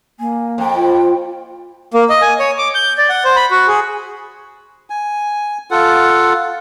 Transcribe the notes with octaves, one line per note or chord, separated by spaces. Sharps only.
A#3 G#5
F2 G5
F4 C5
A#3
D#5
G#5
C#5
D6
G6
D5
F#5
C5
B5
F#4
G#4
G#5
F4 A4 F#5